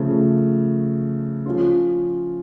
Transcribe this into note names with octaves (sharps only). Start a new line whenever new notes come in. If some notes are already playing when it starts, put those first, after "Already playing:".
Already playing: C#3 F3 A3
F3 C#4 F4